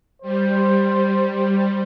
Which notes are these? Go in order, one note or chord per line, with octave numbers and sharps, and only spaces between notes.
G3 C5